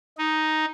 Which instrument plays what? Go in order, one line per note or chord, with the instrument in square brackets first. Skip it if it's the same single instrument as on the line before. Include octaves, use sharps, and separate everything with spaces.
[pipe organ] D#4